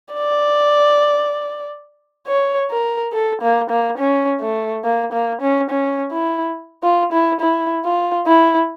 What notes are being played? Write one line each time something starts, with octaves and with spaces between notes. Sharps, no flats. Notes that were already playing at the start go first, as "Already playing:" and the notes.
D5
C#5
A#4
A4
A#3
A#3
C#4
A3
A#3
A#3
C#4
C#4
E4
F4
E4
E4
F4
E4